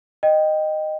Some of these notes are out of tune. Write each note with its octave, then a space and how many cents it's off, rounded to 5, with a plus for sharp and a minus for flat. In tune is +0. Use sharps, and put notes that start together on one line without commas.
D#5 -10 G5 +0